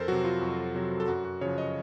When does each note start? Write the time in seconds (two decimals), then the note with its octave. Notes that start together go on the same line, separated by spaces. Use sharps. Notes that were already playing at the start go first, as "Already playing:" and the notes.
Already playing: F2 A4 A#4 C5
0.08 C3 F#3 F#4
0.24 F4
0.41 F2
0.75 C3 F#3
1.00 A4
1.08 F#2 F#4
1.25 F#4
1.41 C#3 F3 C#5
1.58 D#5